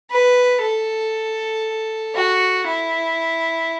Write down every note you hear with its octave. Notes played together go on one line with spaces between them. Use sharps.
B4
A4
F#4
E4